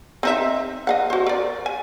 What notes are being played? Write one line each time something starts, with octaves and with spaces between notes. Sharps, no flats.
C4 D#4 E5
D#5 F5 F#5
F#4 C5
A#4 D5
G#5